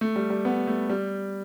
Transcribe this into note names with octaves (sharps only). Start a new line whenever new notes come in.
A3
G3
G3
B3
A3
G3